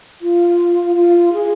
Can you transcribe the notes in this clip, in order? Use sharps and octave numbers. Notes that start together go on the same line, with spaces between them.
F4
F4
G#4